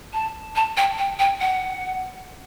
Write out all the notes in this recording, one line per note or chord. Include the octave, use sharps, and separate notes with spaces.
A5
A5
G5
G5
G5
F#5